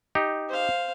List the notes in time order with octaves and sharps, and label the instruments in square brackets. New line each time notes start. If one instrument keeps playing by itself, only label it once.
[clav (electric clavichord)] D#4 G4
[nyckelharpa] C5 F5